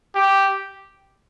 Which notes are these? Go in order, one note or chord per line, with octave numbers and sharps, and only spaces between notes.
G4